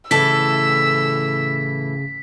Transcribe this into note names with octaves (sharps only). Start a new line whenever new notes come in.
A2 C#3 E3 A4 E6 B6